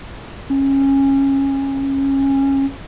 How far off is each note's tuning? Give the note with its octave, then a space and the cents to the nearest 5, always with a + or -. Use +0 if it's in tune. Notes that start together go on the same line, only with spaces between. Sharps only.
C#4 -20